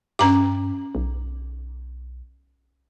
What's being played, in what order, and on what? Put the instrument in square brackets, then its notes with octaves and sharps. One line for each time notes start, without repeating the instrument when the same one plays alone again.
[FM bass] G2 [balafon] C#4 A#5 D6
[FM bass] B1